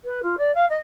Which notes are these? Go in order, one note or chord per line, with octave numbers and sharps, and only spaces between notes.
B4
F4
D5
F5
D#5